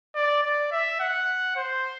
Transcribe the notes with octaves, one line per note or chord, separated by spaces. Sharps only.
D5
D5
E5
F#5
C5